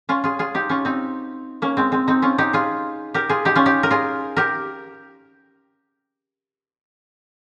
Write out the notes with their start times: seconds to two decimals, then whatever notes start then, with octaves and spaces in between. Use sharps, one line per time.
0.09 C#4 F4
0.24 F4 G#4
0.39 F4 G#4
0.54 D#4 G4
0.69 C#4 F4
0.85 C4 D#4
1.62 A#3 C#4
1.77 G#3 C4
1.92 G#3 C4
2.08 C4 D#4
2.22 C#4 F4
2.38 D#4 G4
2.53 F4 G#4
3.14 G4 A#4
3.29 F4 G#4
3.45 D#4 G4
3.56 C#4 F4
3.66 D#4 G4
3.83 A#4
3.91 F4 G#4
4.36 G4 A#4